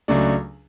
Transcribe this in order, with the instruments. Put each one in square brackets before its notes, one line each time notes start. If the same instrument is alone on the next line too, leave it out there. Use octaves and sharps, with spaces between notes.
[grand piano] C#2 C#3 F#3 A3 D4